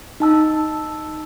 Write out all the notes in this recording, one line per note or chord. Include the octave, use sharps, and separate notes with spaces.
D#4 A5 E6